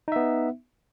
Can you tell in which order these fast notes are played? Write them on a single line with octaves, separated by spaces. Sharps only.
D#4 E5 B3